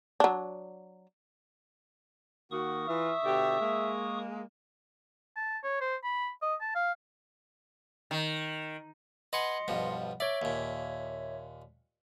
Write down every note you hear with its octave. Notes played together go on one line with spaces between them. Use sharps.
F#3 D4
D#3 A#3 F#4 C#6 D#6
E3 F4 E5
B2 D3 G4
G#3 A#3
A5
C#5
C5
B5
D#5
A5
F5
D#3
B4 D#5 F#5 G#5 C6 C#7
B1 G2 F3
C#5 D5 E5
D#2 A#2